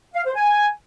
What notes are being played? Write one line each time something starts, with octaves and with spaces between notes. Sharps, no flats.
F5
C5
G#5